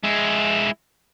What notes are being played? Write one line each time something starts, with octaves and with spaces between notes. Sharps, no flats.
G#3 E4